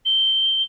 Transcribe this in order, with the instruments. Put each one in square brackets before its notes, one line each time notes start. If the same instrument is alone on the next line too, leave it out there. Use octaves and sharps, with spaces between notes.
[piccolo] G7